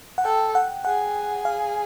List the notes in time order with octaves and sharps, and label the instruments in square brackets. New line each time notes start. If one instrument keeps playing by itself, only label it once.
[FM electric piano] F#5
[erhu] A4 [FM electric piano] G5
[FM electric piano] F#5
[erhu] G#4 [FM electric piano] F#5
[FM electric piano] F5